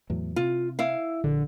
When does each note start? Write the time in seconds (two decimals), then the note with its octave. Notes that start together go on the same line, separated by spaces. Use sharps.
0.10 E2 A2 F#3
0.36 C3 F4
0.79 E4 F5
1.24 A#1 D3